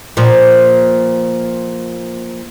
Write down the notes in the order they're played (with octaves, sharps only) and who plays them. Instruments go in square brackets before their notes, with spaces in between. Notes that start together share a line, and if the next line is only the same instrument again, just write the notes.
[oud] A#2 F3